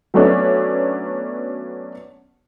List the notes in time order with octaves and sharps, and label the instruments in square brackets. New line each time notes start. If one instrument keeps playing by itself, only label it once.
[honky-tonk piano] F#3 A3 B3 C#4 D4